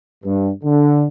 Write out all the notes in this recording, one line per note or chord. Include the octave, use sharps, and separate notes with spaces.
G2
D3